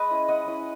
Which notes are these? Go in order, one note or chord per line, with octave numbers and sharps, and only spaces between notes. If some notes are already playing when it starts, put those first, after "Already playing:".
Already playing: G#3 B4 D#5
C#4 E4
G#3 D#5 F#5
C#4 E4